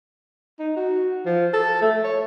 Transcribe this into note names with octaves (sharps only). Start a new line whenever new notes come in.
D#4
F#4
F3
A4
A3
C#5